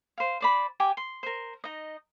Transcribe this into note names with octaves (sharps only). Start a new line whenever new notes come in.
C5 F5
C5 D5 B5
G4 G#5 D6
C6
A#4 C5
D#4 D#5